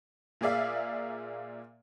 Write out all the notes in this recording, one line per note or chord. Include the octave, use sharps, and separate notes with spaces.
A#2 A#3 G#4 D5 E5 F5